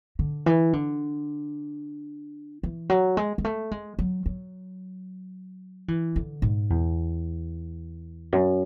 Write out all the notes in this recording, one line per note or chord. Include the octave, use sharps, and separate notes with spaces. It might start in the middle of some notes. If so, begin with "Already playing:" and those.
D3
E3
D3
E3
F#3
G#3
G#3
A3
G#3
F#3
F#3
E3
D3
G#2
E2
F#2